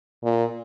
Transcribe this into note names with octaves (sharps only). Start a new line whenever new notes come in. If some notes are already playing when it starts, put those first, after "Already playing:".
A#2